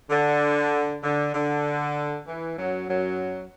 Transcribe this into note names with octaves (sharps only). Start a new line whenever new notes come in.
D3
D3
D3
E3
F#2 F#3
F#2 F#3